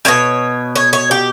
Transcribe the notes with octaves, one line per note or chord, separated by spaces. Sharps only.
B2 G3 C#5
C#5
C#5
G4